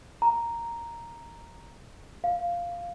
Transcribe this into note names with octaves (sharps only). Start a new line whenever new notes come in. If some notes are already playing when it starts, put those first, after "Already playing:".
A#5
F5